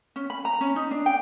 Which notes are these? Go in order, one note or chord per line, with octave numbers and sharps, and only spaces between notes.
C#4
B5
A#5
C#4
D#4
D4
G5